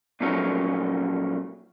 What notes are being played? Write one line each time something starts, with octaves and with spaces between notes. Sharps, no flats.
A#2 F3 F#3 A3 C#4 D#4